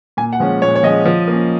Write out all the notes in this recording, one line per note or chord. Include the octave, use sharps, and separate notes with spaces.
A#2 G#5
F#5
F3 G#3 C#4
A#2 C#5
C#5
F3 G#3 C#4 D#5
F3
A#3
C#4